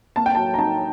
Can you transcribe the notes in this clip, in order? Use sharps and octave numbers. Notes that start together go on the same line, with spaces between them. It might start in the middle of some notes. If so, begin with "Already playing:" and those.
A#3 A5
G5
F#3 A5
A#5
D#4 A5